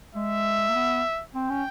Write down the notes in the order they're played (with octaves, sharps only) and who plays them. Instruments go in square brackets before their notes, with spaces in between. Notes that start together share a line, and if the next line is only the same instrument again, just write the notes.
[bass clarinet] G#3 [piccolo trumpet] E5
[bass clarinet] A#3
B3
[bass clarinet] C4 [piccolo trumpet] G5
[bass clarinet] C#4